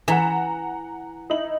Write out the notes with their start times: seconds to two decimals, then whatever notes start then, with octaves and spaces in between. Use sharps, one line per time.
0.08 E3 F#5 A#5 E7
1.30 D#4 E4 F#7